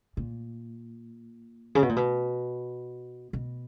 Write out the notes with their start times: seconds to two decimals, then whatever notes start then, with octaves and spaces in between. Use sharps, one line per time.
0.17 A#2
1.75 C#3
1.82 B2
1.89 A#2
1.96 B2
3.33 B2